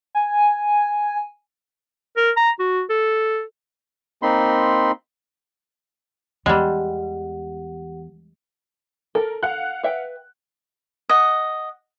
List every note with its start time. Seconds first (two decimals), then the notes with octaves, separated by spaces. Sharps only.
0.15 G#5
2.17 A#4
2.36 A#5
2.59 F#4
2.90 A4
4.23 A#3 C4 D#4 B5 C6
6.46 E2 G3 G#3 G4 F#5
9.15 A4 A#4
9.43 F5 F#5 F#6
9.83 B4 E5 G5
11.09 D#5 F#5